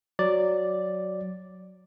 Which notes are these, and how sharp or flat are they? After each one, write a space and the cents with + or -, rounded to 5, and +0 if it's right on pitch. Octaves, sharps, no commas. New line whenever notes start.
F#3 +0 D5 +0